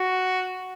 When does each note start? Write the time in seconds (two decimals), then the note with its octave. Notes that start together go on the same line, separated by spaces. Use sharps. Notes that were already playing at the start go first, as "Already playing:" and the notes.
Already playing: F#4